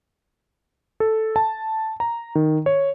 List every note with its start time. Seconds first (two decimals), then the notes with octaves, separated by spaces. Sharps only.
1.00 A4
1.36 A5
2.00 A#5
2.35 D#3
2.66 C#5